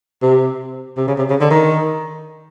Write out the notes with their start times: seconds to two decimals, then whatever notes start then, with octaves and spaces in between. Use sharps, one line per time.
0.22 C3
0.97 C3
1.08 C#3
1.18 C3
1.30 C#3
1.41 D3
1.51 D#3